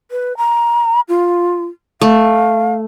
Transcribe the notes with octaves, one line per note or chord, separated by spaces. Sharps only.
B4
A#5
F4
A3 F5